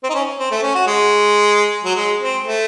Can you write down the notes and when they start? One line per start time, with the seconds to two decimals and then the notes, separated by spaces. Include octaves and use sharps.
0.04 C4
0.09 D#4
0.14 C#4
0.39 C4
0.51 A3
0.63 C#4
0.75 F#4
0.87 G#3
1.84 F#3
1.95 G#3
2.20 C4
2.44 A3